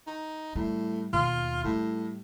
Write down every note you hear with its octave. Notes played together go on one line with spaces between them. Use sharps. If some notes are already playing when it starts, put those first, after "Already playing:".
D#4
A2 G3
D#2 B2 F4
A2 G3